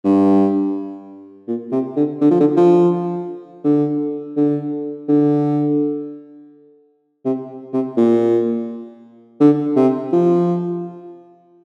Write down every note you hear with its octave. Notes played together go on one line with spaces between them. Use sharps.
G2
A#2
C3
D3
D3
F3
D3
F3
D3
D3
D3
C3
C3
A#2
D3
C3
F3